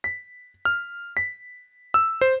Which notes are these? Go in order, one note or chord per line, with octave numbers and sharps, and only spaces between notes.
B6
F6
B6
E6
C5